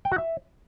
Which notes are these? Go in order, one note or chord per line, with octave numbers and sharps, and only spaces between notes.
G5
F#4
E5